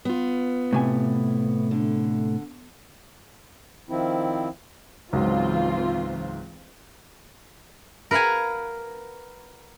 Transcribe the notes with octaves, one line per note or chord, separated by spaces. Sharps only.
B3 F4
A2 C3 G#5
D3
D#3 F3 C4 E4
C#2 G#2 E3 F#3 C4 F4
A#4 B4 F5 F#5 G#5